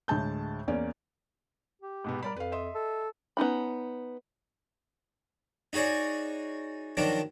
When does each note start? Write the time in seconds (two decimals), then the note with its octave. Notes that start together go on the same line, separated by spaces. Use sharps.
0.08 D2 A2 G#3 A5 G6
0.68 E2 A#3 C#4 D5
1.82 G4
2.04 G#2 B2 B3
2.23 G3 A#4 D5 B5
2.36 F2 B4 F5
2.52 D#5 E5 C6
2.75 A4
3.37 B3 C#4 D#4 B5
5.73 D#4 F#4 G#4 C#5 D5
6.97 D#3 F3 F#3 D4 D6